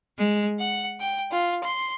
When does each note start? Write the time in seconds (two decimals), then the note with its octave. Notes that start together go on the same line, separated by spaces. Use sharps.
0.18 G#3
0.57 F#5
0.99 G5
1.31 F4
1.62 C6